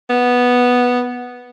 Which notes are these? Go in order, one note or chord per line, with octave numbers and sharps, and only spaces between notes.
B3